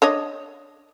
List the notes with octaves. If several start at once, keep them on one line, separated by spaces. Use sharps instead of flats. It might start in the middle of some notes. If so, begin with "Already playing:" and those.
D4 C#5 D#5